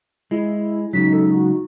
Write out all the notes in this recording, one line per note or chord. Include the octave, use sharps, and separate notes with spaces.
G#3 E4
C#2 C#3 F#3 D#4 B6
A4
F#4